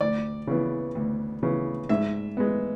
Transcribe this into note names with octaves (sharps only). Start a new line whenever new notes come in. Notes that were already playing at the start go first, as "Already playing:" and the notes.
D2 D5
C#3 E3 B3
D2
C#3 E3 B3
G#2 E5
G#3 B3